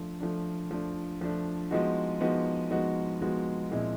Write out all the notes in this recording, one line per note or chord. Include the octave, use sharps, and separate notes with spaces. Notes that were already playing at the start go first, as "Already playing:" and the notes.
Already playing: F3 A3 D4
F3 A3 D4
F3 A3 D4
F3 A3 D4
F3 G#3 B3 D#4 F#4
F3 G#3 B3 D#4 F#4
F3 G#3 B3 D#4 F#4
F3 G#3 B3 D#4 F#4
A#2 F3 G#3 C4 E4